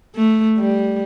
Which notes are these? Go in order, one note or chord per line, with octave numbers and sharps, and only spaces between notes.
A3
G3